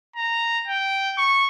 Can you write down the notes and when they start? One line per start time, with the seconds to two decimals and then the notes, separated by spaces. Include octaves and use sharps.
0.16 A#5
0.67 G5
1.17 C#6